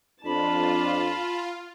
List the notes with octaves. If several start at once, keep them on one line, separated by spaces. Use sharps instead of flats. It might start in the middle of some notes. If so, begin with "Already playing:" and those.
F2 D4 F4 A5 B5